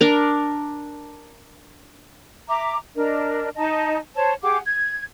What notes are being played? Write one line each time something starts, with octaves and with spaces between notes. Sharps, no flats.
D4 A#4
E5 A#5 D6
D4 A#4 D#5
D#4 D#5 A5
C5 C#5 A5
G4 G#4 F#5 D6
G#6